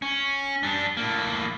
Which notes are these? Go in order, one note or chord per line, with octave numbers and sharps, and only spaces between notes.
C#4
G3 D4
A2 A#3